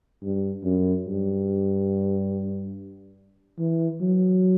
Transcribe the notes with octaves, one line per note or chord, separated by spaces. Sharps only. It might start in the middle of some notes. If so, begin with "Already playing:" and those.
G2
F#2
G2
E3
F#3